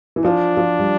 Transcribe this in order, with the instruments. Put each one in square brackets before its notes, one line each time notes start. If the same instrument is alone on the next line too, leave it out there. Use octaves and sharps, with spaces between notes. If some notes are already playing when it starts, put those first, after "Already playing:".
[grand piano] E3
[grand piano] F3 [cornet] D4
[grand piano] F3
G3